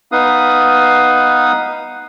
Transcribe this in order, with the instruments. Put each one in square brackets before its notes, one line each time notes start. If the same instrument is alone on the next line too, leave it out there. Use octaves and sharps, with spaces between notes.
[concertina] B3 D#4 B4 F5 D#6